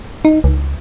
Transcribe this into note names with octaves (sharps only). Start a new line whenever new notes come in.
D#4
C#2